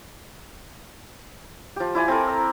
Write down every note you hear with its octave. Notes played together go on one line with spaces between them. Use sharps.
F3 G4
E4 D5 G#5
C4 A4 A#4
A#5 E6